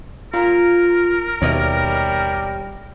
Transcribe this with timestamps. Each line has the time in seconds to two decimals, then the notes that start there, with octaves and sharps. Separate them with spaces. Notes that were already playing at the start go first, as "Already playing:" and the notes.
0.34 F4 A#4 F5 A#5
1.42 D#2 B2 G3 C#5 D#5 E5